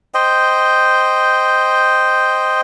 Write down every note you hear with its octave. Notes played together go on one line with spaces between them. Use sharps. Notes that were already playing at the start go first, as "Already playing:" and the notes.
C5 D#5 G5